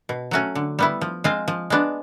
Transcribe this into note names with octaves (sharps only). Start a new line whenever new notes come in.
B2
F#3 A3 C#4 F#4
D3
G3 B3 E4
F3
G#3 C4 F4
F3
G#3 B3 D4